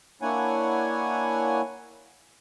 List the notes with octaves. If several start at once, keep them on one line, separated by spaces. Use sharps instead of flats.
A#3 D4 E4 C#5 F#5 G#5